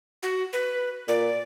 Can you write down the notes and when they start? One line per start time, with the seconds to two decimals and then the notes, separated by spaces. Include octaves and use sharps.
0.23 F#4
0.53 B4
1.08 A#2 D5